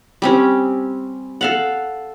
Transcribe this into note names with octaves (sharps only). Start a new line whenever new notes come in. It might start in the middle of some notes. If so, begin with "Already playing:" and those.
G3 C4 C#4
A4 F5 F#5